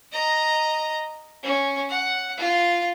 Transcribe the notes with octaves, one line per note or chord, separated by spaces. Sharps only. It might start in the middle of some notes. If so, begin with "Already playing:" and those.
D#5 A#5
C#4
F#5
F4